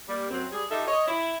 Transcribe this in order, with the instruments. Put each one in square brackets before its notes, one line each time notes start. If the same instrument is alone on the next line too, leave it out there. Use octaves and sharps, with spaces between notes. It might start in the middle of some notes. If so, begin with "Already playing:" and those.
[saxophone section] G3 A#3
F#2 F#3 C4
G3 G#4
D#4 F4 G4 A4 E5
C#5 D#5
E4